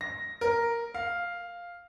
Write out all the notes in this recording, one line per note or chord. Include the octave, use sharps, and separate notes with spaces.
A#6
A#4
F5